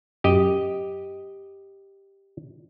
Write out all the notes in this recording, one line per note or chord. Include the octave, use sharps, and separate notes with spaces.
F#2 G4 D#5